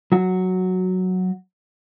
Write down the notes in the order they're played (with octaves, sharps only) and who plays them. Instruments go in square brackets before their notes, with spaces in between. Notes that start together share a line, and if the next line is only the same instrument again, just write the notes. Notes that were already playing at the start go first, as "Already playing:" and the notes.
[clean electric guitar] F#3 F#4